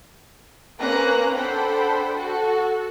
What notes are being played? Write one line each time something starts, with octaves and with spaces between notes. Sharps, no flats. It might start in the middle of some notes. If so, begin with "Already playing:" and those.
A#3 C4 C#4 B4 A#5 F#6
D4 A4 C5 F#5 G5 B5
F#4 A4